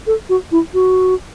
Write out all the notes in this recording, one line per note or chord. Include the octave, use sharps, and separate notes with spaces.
A4
F#4
E4
F#4